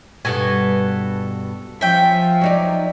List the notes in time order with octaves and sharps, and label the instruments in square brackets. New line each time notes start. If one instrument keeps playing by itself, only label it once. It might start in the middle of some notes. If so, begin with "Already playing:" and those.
[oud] G2 B2 [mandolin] F#4 A4 G#5
[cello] F3 [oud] C#4 [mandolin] E5 G5
[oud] F#3 D#4 D5